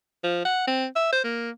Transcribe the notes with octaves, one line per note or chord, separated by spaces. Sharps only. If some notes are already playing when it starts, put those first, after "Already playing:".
F3
F#5
C4
E5
C5
A#3